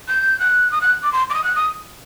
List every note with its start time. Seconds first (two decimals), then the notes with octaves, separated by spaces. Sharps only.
0.08 G6
0.40 F#6
0.72 D#6
0.82 F#6
1.03 D6
1.12 C6
1.30 D6
1.34 D#6
1.44 F#6
1.56 D#6